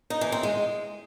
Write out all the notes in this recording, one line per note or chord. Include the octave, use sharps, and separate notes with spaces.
D#4
E3
C4
G#3